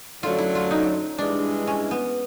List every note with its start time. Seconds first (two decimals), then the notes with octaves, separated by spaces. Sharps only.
0.22 F#2 D3 F#3 A3 F4
0.38 E4
0.55 F4
0.71 D#4
1.19 G2 E3 G#3 D4
1.67 C#4
1.91 B3